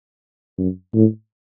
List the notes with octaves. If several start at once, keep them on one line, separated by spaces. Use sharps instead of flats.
F#2
A2